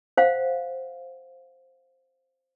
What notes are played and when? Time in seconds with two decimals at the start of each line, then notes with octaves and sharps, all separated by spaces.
0.17 C5 F5 F#5